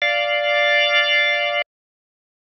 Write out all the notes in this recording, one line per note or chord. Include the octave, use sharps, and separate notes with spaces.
D5 F5